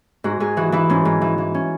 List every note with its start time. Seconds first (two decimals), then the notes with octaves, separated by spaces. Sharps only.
0.24 G#2 F#4
0.40 G#2 G#4
0.57 E3 F#4
0.72 E3 E4
0.89 G#2 C#4
1.05 G#2
1.21 E3
1.38 E3
1.54 C#4